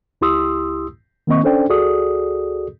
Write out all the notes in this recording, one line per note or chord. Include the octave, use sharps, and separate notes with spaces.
C#2 E4 G4 C6 D#6 E6
D#3 A#3 C4 D#5 C#6
C#4 D4 A4 C5 D5 G5
C#2 F#4 G#4 A4 D5 D#6